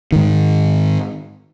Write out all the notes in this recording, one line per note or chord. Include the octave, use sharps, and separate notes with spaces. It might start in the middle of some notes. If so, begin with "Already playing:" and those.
G#2 D#3